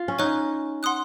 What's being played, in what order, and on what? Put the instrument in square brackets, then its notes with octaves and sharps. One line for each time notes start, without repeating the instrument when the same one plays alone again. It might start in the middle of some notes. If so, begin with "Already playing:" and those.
Already playing: [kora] F4
C#4
[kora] D#4 [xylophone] C#5 G#5 C#6 F#6
[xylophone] F#5 C6 D#6 F#6